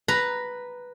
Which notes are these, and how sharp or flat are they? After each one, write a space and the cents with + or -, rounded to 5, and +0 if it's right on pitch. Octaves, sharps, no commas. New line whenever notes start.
B4 +0 A#5 +0